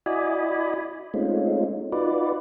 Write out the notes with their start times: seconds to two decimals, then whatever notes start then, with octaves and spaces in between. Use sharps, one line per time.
0.06 E4 F#4 D5 D#5 G#5 B5
1.14 G#3 A3 C4 C#4 D#4 F4
1.92 D#4 F4 F#4 B4 D5